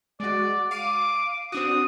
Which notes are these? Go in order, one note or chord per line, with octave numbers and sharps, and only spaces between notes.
G#3 F#4 D5
F5 D6 C7 D#7
C4 D4 F#4 D#6